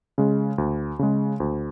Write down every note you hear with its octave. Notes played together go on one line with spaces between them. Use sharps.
C#3 G#3
D2
C#3 G#3
D2